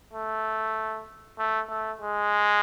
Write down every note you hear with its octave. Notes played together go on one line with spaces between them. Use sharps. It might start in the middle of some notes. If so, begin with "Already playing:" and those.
A3
A3
A3
G#3